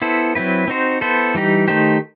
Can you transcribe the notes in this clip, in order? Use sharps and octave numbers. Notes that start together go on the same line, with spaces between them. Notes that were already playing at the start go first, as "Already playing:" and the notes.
B3 E4 A4 C5
F#3 C4 E4 B4
C4 D#4 F#4 C5
B3 E4 A4 C5
E3 G3 D#4 G4
D#3 A3 D#4 G4 C5